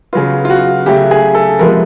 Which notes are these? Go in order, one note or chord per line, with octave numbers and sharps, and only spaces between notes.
C#3 F#3 B3 F4
F4
F#4
C#3 F#3 A3 G4
G#4
A4
C3 F3 G#3 B3 A#4